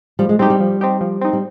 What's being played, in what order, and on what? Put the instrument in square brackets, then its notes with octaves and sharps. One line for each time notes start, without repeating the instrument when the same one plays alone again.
[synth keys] F3 [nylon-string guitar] G3
[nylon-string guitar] G#3
[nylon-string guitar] G3 [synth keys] C4 D#4 G4
[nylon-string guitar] G3
[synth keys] F3
C4 D#4 G4
F3
C4 D#4
[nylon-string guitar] G3